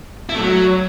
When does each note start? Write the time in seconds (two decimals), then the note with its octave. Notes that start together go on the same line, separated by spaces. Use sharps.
0.29 E4
0.35 A3
0.40 F#3